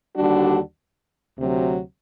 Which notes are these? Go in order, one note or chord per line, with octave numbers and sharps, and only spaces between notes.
D#2 D3 G3 D4 F#4
D2 C3 F#3